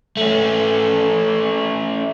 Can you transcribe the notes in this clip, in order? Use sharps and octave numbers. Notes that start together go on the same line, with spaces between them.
A3 C#4